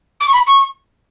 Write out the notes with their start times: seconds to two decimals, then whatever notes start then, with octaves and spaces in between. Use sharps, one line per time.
0.20 D6
0.27 C#6
0.34 B5
0.47 C#6